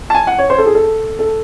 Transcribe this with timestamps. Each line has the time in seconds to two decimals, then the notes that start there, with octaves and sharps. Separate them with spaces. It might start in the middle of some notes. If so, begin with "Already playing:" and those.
0.10 A5
0.15 G#5
0.27 F#5
0.39 C#5
0.50 C5
0.58 A4
0.66 G#4
0.75 A4
1.19 A4